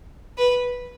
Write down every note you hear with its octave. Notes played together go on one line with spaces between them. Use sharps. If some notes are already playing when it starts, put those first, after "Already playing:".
B4